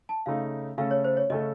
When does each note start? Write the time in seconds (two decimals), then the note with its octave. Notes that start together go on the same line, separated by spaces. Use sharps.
0.09 A5
0.26 C#3 A3 D#4 F5
0.78 C#3 A3 C#4 A4 F5
0.91 C#5
1.04 C5
1.17 C#5
1.30 C#3 A3 C#4 A4 D#5